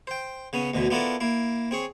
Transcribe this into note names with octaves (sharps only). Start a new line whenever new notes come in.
C5 G5
C#3 B3 C#4
D2 B2 D3 E3
B3 D4 E4 F4 A4 A#4
A#3 E4
C4 G#4 C#5